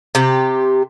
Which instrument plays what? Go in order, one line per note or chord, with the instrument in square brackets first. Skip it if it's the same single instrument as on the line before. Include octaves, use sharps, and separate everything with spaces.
[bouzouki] C3 G4